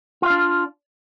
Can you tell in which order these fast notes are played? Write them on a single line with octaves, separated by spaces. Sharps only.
F4 F5 D4